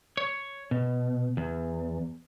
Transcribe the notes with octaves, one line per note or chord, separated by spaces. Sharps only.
C#5
B2
E2